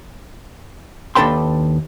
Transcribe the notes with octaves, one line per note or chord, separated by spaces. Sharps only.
D#2 D4 A4 B4 G5 C6